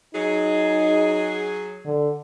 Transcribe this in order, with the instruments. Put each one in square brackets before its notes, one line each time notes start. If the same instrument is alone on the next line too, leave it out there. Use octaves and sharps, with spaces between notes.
[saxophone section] F#3 G#4 [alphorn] D#4
[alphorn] D3